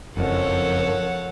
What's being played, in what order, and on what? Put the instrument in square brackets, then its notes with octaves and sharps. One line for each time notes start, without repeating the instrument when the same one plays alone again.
[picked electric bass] F#1 F2 [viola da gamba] F3 A4 C#5 [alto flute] A#4 [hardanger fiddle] F#5